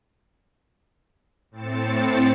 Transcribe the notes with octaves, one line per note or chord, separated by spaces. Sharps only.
A2 C4 A6 C#7 E7